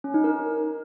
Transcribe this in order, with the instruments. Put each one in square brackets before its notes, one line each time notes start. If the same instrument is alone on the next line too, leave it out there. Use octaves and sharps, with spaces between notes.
[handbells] C#4
D#4
A#4